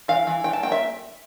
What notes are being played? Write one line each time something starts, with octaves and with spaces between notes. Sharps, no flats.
E3 F5
E3
E3 G5
A5
A#3 G5
E5